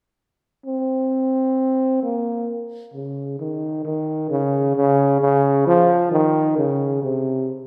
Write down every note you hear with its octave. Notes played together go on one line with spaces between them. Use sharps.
C4
A#3
C#3
D#3
D#3
C#3
C#3
C#3
F3
D#3
C#3
C3